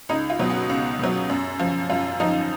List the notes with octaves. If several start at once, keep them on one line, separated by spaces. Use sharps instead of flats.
C#2 D#4
F4
B2 F#3
F#4
C#2
B2 F#3
F#2
F3
F#2 F4
F3 D#4